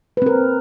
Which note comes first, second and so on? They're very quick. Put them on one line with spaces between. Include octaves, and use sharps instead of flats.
B4 C4 A#4